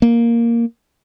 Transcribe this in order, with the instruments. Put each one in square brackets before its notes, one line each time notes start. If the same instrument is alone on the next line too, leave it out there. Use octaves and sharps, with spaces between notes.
[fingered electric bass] A#3